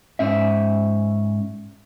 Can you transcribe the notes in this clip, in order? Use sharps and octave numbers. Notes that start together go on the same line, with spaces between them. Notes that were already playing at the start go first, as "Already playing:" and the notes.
G#2 C#4 E5